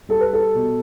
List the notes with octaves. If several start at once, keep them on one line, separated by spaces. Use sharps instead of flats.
G3 A4
B4
A4
B2